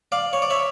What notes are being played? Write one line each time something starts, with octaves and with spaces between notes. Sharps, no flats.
D5 F5
C#5
D5
C#5 E5